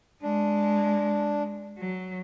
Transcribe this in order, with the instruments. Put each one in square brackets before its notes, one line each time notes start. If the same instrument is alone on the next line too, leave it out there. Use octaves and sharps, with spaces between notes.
[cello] G#3 [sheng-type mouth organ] D4
[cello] F#3